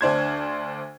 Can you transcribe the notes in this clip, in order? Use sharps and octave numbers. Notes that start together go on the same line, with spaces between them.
D2 D4 C5 G#6